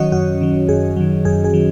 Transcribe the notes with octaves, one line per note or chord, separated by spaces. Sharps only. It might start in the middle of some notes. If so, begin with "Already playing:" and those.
Already playing: D#3 F#3 C#4 F#4 C#5 D#5
F#2 F#4
D#3 F#3
F#2 G#4
D#3 F#3
F#2 G#4
G#4
D#3 F#3